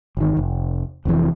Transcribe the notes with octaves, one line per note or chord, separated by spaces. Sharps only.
G1 D#3
F1
F1 F2 A2 E3